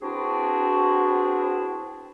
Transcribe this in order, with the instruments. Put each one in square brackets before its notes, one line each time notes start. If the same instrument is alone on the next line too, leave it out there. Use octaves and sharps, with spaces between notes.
[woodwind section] B3 C4 D4 E4 F#4 G#4